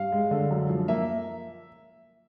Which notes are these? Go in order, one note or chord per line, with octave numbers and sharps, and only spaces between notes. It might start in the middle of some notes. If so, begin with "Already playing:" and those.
Already playing: G2 F5
G#3
D3
F#2
F3
A#3 E5